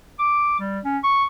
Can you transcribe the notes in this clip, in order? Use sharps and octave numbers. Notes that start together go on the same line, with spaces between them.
D6
G3
C#4
C#6